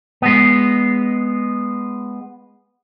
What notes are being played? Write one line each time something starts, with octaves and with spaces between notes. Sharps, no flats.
G#3 B3